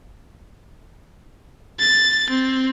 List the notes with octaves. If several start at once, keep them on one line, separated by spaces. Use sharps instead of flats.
A6
C4